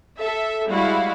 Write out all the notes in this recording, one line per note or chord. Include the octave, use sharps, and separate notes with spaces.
A4 E5
G3 G#3 E4 F#4 F5